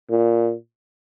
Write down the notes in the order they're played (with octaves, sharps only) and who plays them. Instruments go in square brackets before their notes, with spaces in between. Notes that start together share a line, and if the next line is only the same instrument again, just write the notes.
[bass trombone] A#2